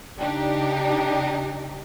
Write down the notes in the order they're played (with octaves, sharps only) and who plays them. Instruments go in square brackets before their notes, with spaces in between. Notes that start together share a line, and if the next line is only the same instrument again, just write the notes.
[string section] C#3 D4 D#4 G4